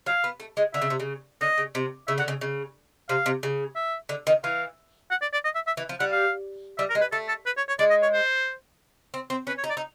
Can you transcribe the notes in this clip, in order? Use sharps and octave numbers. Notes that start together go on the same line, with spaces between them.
F#3 F5
B3
A3
G#3
D3 E5
C#3
C3
C#3
D3 D#5
C#3
C3
C#3 E5
D3 F#5
C#3
C#3
C3 F5
C3
C#3
E5
D3
D#3
E3 F5
F#5
D5
D5
D#5
E5
E5
E3
F3
G3 F#5
F5
G3 E5
A#4
G#3
B4
A3 A4
A4
B4
C#5
C#5
G#3 D5
D#5
C#5
C5
C4
C4
C#4 B4
C#5
D#4
D5
D#4